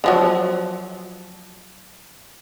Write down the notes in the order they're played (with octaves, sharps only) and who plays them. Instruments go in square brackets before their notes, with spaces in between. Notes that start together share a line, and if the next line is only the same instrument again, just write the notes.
[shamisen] D3 F3 F#3